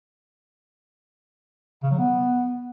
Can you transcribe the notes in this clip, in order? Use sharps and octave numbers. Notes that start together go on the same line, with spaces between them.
C#3
F#3
B3